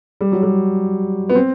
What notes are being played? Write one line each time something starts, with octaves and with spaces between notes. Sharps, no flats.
G3
F#3
G3
B3
C4